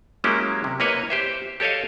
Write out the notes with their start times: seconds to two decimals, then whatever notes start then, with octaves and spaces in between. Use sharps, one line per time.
0.24 F#3 G#3 A#3 C#4 E4 G4
0.64 C3
0.80 A#3 E4 B4 C#5 D#5
1.10 G4 C5 E5
1.60 G4 A4 C#5 D#5 F5